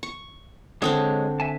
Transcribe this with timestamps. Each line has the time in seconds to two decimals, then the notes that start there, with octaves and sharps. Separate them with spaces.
0.03 C#6
0.82 D3 G#3 C4 D4 C#5 D#6
1.40 E5 G#5 A5